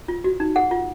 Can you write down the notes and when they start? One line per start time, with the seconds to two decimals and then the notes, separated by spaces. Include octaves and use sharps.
0.08 F4
0.24 F#4
0.40 D#4
0.56 G#4 F#5
0.71 F4